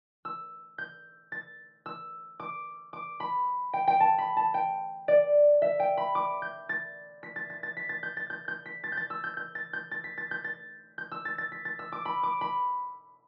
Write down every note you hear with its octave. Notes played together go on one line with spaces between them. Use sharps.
E6
G6
A6
E6
D6
D6
B5
G5
G5
A5
B5
A5
G5
D5
E5
G5
B5
D6
G6
A6
B6
A6
A6
A6
B6
A6
G6
A6
G6
G6
B6
A6
G6
A6
E6
G6
G6
A6
G6
A6
B6
A6
G6
A6
G6
E6
A6
A6
B6
A6
E6
D6
B5
D6
B5